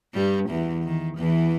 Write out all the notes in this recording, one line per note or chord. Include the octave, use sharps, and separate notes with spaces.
G2 G3
E2 E3
D#3
E2 E3